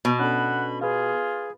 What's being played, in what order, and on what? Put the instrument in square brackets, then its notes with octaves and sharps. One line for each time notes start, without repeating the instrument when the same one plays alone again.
[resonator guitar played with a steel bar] B2
[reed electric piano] C#4 D4 A4 [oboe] F#5 [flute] B5
[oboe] F4 [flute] G#4 [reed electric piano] B4 F5